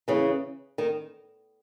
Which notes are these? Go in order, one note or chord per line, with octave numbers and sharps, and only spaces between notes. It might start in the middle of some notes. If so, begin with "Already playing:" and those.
C#3 E3
D#3